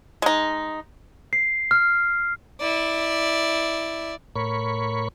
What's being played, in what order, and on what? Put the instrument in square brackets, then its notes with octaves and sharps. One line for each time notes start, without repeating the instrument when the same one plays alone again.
[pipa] G#3 D#4
[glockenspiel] C7
F6
[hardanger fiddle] E4 D5
[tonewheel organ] A2 A#4 C#5 B5 C#6